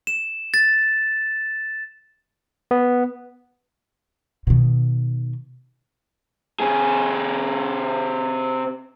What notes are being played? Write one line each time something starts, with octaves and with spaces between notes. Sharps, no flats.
E7
A6
B3
B2 D#3
C3 G#4